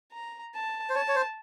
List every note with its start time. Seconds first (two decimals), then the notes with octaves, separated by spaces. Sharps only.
0.12 A#5
0.54 A5
0.89 C5
0.95 C#5 A5
1.08 C#5
1.16 C5